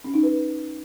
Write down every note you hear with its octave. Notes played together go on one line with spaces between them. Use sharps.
C#4
D#4
B4